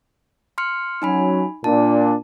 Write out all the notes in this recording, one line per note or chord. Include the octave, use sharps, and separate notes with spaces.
C6 F6 C#7
F#3 C#4 D#4 G#5 B5
A#2 D4 A5